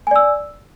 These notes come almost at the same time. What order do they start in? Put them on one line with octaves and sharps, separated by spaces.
G#5 D5 E6